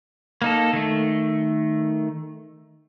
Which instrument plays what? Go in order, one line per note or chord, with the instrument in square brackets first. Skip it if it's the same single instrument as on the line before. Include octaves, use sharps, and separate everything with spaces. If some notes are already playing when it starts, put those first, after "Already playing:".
[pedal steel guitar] A#3 D#4 A4
D#3 A3